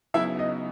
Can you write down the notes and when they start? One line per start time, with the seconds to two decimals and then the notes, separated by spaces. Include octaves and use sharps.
0.14 C#3 F#3 B3 D#4 E4 E5
0.39 D#5